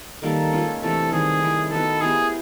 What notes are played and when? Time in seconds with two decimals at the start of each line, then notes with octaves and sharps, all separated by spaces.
0.22 D#3 G3 A#3 A4
0.52 G#3 C#4 F4
0.82 C3 E3 A3 D4 A4
1.11 D#3 G3 C4 G#4
1.41 D#3 G3 C4 E4
1.71 B3 D#4 F#4 A4 B4
2.01 B3 E4 G4 G#4 C5